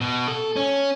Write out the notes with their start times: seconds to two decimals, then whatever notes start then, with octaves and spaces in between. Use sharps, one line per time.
0.01 B2
0.28 A4
0.56 C#4